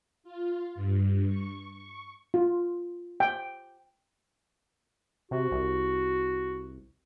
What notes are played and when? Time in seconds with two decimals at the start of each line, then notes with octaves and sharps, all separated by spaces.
0.24 F4
0.75 G2
1.27 C#6
1.72 C#6
2.34 F4
3.20 G5
5.31 C3 F#4
5.51 C2